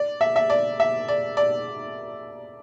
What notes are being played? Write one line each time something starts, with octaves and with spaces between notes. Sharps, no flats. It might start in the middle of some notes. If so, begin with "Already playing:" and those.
Already playing: D5
E5
E5
D5
E5
D5
D5